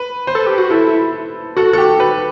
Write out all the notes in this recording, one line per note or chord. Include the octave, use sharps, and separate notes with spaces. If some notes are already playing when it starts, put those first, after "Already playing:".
Already playing: B4
C5
A4
G4
F#4
E4 A4
F#4 A4
A4
G4
B4